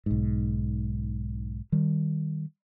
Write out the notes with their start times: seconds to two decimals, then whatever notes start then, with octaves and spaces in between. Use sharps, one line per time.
0.06 B1 G#2
1.72 D#3 G3